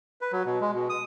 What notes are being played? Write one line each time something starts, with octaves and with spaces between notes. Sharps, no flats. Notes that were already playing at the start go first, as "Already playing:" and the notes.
B4
F#3
B2
G#3
B2
D#6